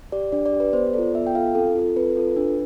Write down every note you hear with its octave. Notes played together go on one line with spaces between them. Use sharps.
G4 D5
D4 D5
D5
G4
B4
B3 C5
F4 A4 D5
B3 E5
G5
F4 A4 F5
C4 A4
F4 A4
C4 B4
F4 A4
D4